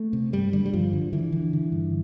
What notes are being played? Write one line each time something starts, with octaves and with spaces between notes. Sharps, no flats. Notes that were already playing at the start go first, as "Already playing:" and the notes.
Already playing: A3
C3
G2 G3
D3 G3
G3
G2 F3
D3
D3 E3
D3
D3
G2